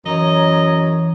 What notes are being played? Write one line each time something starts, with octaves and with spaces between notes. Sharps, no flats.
F#2 E3 C#5 D#5 A#5